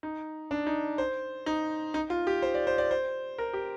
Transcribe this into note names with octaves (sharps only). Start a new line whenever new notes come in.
D#4
D4
D#4
C5
D#4
D#4
F4
G4
C5
D5
C5
D5
C5
A#4
G4